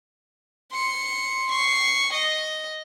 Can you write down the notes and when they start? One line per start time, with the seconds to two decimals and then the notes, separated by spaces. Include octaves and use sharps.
0.72 C6 C#7
1.51 C#6 C7
2.13 D#5